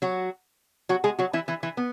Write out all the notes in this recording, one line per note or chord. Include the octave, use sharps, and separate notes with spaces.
F#3 F#4
F#3 F#4
G#3 G#4
F#3 F#4
E3 E4
E3 E4
E3 E4
B3